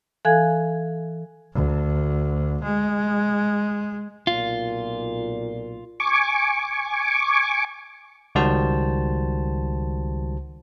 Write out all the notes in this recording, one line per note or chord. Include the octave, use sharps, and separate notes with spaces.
E3 A4 F5 G#5 F#6 G#6
D2
G#3
B1 A#2 F4
G#5 C#6 D6
C#2 D#3 G3 F#4 C5 A5